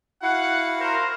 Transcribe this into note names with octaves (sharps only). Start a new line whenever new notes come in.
E4 F#4 F5 F#5
A#4 C5